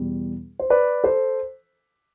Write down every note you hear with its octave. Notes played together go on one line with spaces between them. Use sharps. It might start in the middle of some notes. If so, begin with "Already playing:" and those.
Already playing: E2 B2 G3
C5
B4 D5
A4 C5